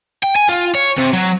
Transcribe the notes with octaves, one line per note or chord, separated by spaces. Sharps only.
G5
G#5
F4
C#5
C3
F#3